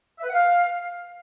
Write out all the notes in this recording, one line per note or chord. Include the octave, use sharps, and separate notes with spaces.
E5
B4
F#5
F5